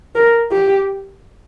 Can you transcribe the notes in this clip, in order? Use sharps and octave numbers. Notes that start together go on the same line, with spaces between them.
A#4
G4